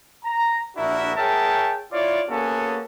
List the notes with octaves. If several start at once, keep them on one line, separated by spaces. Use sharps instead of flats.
A#5
A#1 D4 E4 F#4 A#4 E5
G#4 A#4 C#5 E5 G5 A5
E4 F4 C#5 D5
A#3 B3 C#4 F#4 G#4 A4